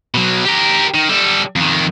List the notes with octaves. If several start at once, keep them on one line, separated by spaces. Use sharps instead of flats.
B2 F#3
G4 A#4
D#3
G3 A4
F2 D#3